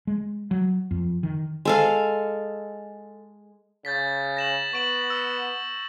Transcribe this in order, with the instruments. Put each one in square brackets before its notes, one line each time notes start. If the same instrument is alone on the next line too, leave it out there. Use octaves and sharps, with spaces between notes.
[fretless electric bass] G#3
F#3
F2
D#3
[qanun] G#3 A4 F5
[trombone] C#3 [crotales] G6 A6 B6
[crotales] A#6 E7 F#7
[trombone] B3 [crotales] C#6 D7 F#7
[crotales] E6